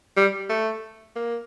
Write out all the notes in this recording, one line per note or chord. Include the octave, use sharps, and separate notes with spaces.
G3
A3
A#3